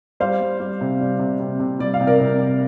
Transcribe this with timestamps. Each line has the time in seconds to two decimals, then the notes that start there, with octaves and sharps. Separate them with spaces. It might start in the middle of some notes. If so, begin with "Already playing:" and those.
0.20 G3 C5 F5
0.40 G3
0.60 G3
0.81 C3
1.00 G3
1.19 C3
1.40 C3
1.60 C3
1.79 G3 D5
1.94 F5
2.00 C3
2.07 A#4 D5
2.20 C3
2.39 C3